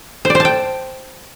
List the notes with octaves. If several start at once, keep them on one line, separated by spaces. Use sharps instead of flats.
C5
D5
C5
A5
G5